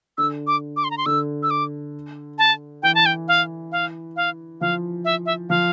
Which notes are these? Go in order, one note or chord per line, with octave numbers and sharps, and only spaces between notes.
D3 E6
D6
D6
C6
A#5
C6
D3 E6
E6
D6
A5
E3 G5
A5
G5
F5
F5
F5
F3 F5
E5
E5
F3 F5